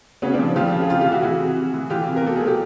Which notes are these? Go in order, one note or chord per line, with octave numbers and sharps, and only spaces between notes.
C#3 B3 C#4
C4 D4
F3
F3 F4 G4
C#3
G#4
C3 F4 G4
F4 G4
E3
E4 F#4
E3 F#4 G#4
C3
C3
E3
E3 F4 G4
C3
A#4
B2 A4
F#3 G#4
G4